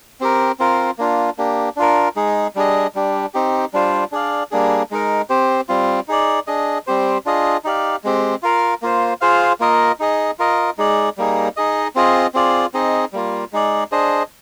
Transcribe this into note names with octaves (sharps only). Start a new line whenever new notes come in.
C4 G4 A#4
C4 F4 A#4
A#3 D4 F4
A#3 D4 G4
D4 F4 A#4
G#3 D#4 G#4
G3 D4 G#4 D#5
G3 D4 G4
C4 D#4 G4
G3 D4 F4 C5
D4 G#4 D5 F5
G3 A#3 D4 G#4
G#3 D#4 A#4
C4 G4 C5
G3 C4 F4
D#4 G#4 D5
D4 G#4 D#5
G3 C4 G4 C5
D4 F4 G#4 D#5
D#4 G4 D5 F5
G#3 C4 G4
F4 A#4 F5
A#3 F4 C5
F4 G#4 C5 F5
A#3 F4 A#4 D#5
D#4 G#4 D#5
F4 A#4 D#5
G#3 D#4 G#4 D5
G3 A#3 D#4 G#4
D#4 G#4 D#5
C4 F4 G#4 D#5
C4 F4 G#4 D5
C4 D#4 G#4 D#5
G3 A#3 F4
G#3 D#4 G#4 D5
D4 G#4 C5 D#5